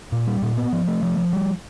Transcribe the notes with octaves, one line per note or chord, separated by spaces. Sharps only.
A#2
G3
A#2
B3
F3
A3
F3
F3
G3